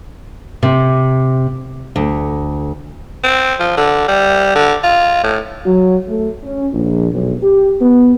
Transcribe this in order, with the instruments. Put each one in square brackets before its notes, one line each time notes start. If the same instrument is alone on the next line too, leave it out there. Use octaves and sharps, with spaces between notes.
[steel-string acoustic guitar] C3
D2
[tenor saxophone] C4
F3
D3
G3
D3
F4
A2
[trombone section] F#3
A3
C#4
A#1
B1
G4
B3